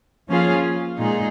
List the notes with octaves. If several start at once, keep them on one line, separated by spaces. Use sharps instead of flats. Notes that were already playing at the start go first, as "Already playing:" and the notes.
F3 A#3 C#4 F4 G#4
A#2 G#3 D#4 G#4